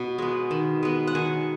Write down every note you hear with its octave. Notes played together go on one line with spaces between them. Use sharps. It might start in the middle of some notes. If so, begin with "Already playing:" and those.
Already playing: B2
G#3 B3
D#3
G#3 B3
F#5
D#3 G#5